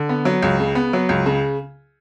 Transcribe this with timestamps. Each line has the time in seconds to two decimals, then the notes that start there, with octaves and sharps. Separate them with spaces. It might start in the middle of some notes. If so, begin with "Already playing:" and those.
Already playing: D3
0.09 B3
0.25 F#3
0.42 C#2
0.60 C#3
0.75 B3
0.93 F#3
1.09 C#2
1.26 C#3